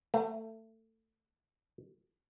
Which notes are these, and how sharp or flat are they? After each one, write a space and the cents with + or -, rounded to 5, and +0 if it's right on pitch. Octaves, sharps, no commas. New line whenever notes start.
A3 +25